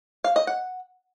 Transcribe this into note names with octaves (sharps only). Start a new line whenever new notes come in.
F5
D#5
F#5